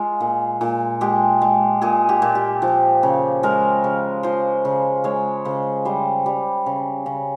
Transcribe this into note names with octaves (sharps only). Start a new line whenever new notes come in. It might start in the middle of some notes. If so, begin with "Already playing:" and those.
Already playing: G#3 F4
A#2
A#2
G#3 G4
G#3
A#2 G#4
G4
A#2
G4
F3
C#3
G#3 A#4
C#3
F3 C5
C#3
G#3 C#5
C#3 C5
G3 C5
G3
C#3
C#3